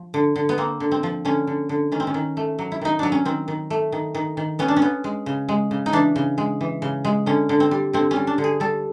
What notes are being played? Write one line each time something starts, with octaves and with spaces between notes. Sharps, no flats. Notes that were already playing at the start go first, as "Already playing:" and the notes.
Already playing: F3
D3
D3
B3
A#3 C4
D3
C4
F3
D3 C#4
D3
D3
D#3 C#4
C4
C#4
D#3
A3
F#3
E4
D#3 D#4
F#3 D4
C#4
D#3 C4
D#3
A3
D#3
D#3
D#3
B3 C#4
D4
C#4
B3
G#3
C#3
G#3
C#3
D#4
E3 D4
C#3
G#3
E3
C#3
G#3
D3 C#4
D3
C4
G3
D3 C4
C#4
G3
D4
D3
G#4
G3 A4